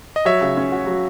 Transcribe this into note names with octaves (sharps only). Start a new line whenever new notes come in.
D#5
F#3 C#5 E5
C#3
C#4
F#4
F#3